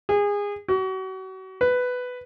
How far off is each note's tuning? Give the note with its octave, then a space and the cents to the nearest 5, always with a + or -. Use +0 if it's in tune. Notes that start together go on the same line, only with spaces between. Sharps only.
G#4 -25
F#4 +35
B4 +10